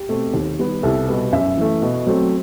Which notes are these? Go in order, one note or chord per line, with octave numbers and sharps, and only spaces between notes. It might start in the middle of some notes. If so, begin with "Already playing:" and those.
Already playing: G4
B2 A3 C4
D#2
D#3 G3 B3
C2 A4
B2 G3 B3
F#2 E5
E3 A3
B2
F#3 A3 C4